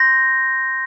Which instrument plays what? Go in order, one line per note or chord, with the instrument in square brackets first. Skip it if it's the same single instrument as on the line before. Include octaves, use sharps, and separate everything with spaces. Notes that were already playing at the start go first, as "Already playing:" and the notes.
Already playing: [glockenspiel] C6 G6 A#6